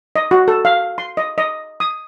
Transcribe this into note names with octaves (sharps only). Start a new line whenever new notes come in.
D#5
F#4
A4
F5
C6
D#5
D#5
D#6